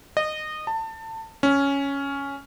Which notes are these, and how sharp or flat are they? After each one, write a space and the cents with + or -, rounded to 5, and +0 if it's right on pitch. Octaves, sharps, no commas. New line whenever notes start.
D#5 -20
A5 +25
C#4 +5